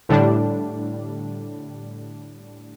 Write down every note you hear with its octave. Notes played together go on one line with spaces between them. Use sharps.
A2 D3 G3 D4